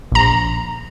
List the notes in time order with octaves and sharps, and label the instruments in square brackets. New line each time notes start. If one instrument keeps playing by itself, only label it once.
[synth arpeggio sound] A#1 A#5